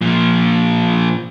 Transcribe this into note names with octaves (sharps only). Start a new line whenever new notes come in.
A#2 F3